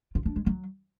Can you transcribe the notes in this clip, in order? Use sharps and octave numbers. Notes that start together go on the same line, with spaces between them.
F4
D4
G#3
F#3